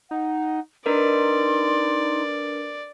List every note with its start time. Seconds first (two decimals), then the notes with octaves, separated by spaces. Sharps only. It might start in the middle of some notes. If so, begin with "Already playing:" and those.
0.11 D#4 F#5
0.86 D4 D#4 A#4 B4 D5 C6